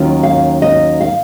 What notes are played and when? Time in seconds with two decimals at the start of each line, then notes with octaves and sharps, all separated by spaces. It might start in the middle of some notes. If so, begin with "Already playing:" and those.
Already playing: D#2 D#3 F#3 C#4 F4
0.23 F5
0.62 D#5
1.01 F5